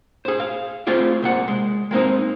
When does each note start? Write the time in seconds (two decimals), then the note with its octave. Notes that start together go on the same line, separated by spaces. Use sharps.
0.25 G#4 C5
0.40 F5
0.87 A3 C4 F4 G#4 D5
1.22 C2 A#2 F#5
1.48 G#3
1.91 G#3 A#3 C4 D#4